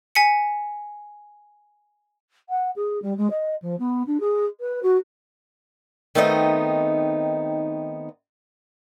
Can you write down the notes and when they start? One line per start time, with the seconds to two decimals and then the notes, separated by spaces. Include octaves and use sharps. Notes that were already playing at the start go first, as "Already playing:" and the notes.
0.15 G#5 B6 C#7
2.49 F#5
2.76 G#4
3.02 G3
3.17 G#3
3.30 D#5
3.62 F3
3.79 B3
4.07 D4
4.20 G#4
4.60 B4
4.83 F#4
6.15 D#3 A3 B3 C4 D#4 D#5